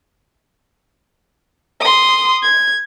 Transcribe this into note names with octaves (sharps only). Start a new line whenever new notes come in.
C6 D#6
G#6